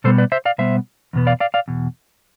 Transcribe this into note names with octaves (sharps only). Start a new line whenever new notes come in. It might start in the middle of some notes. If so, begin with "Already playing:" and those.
B2 G3 B3 A4 C5
B4 D5
C5 E5
D5 F5
B2 G3 B3 C5 E5
E2 B2 B3
D5 F5
D5 F5
D5 F5
E2 B2